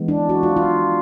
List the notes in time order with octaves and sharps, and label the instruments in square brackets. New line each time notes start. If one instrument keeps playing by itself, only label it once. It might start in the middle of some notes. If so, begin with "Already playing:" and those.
Already playing: [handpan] E3 G#3 B3
D4
F#4
F4
F4